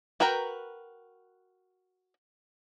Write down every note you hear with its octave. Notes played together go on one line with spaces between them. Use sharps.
F#4 A#4 B4 G5 A#5